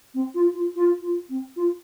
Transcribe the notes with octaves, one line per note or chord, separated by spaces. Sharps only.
C4
F4
F4
F4
F4
C4
F4